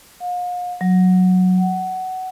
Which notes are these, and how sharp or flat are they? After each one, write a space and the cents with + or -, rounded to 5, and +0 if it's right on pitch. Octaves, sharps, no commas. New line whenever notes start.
F5 +40
F#3 -10
F#5 +15